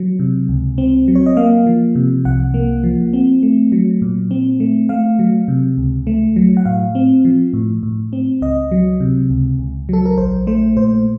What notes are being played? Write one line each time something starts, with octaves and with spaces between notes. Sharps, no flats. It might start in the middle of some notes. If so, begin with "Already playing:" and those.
Already playing: F#3
C3
C#2
C4
F#3
C#5
D#5
A#3 F5
F3
C3
C2 F#5
A#3
F3
C4
A3
F#3
A#2
C4
A3
A3 F5
F#3
C3
C#2
A3
F#3
F#5
A2 F5
C4
F3
A2
A2
C4
C#2 D#5
F#3
C3
C#2
C#2
F#3 A4
A#4
A#1 C5
A3 C5
A#2 C5